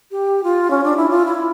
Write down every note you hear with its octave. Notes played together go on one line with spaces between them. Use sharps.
G4
F4
C#4
D4
E4
F4
E4